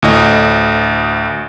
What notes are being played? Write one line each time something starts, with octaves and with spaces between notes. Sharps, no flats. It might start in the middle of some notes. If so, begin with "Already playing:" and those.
D2 A2 D#5